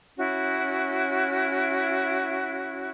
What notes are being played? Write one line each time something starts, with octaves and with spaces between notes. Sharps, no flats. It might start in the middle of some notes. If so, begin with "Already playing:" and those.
C#4 E4 F#4